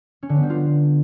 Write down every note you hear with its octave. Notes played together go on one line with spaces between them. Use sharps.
C#4
D3
B3
G3
F4